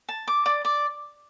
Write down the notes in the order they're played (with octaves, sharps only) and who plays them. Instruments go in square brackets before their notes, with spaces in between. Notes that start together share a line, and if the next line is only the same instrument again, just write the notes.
[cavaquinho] A5
D6
D5
D5